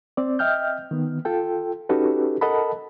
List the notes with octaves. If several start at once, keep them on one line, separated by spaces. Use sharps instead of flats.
C4 D5
D#5 E5 G5 F6 G6
D#3 B3
F4 A4 G5
C#4 D#4 F#4 G4 A4 B4
A4 A#4 D#5 F#5 A5 B5